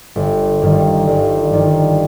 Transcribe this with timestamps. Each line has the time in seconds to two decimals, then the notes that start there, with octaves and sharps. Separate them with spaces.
0.16 G1
0.62 G2 D#3 G3
1.07 G1
1.53 G2 D#3 G3